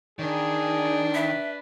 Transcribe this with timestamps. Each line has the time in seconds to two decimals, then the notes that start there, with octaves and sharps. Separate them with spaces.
0.19 D#3 D4 G#4
1.15 B4 E5